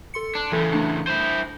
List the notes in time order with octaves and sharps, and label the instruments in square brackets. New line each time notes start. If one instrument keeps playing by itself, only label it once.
[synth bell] A4 C6 C#7
[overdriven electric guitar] D4
[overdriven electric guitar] A2 C#3 [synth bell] E3 A4
[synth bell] A3 D4 A5
[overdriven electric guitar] E4 C5